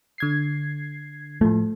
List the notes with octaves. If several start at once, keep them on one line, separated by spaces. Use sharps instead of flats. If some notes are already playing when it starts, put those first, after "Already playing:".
D3 G#6 C7
A2 F3 A3